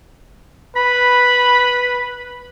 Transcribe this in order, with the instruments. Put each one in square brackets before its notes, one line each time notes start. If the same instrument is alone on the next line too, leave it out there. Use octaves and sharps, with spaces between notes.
[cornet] B4 [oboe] B5